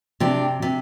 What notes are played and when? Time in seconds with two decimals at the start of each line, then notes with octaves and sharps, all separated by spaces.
0.20 C3 D4 G4
0.62 C3